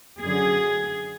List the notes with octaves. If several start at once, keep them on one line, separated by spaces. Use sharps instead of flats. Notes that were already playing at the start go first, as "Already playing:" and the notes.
F#2 D3 G#4